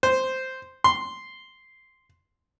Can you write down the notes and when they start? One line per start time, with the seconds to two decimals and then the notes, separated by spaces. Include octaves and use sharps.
0.03 C5
0.84 C6